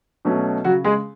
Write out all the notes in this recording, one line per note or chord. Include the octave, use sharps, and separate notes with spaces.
B2 F#3 A3 C#4
C#3 F#3 F#4
G#3 G#4